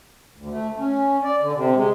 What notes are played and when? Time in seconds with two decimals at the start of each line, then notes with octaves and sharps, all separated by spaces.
0.37 D2
0.51 A3
0.79 C#4
1.24 D5
1.42 D3
1.55 C3
1.74 G#3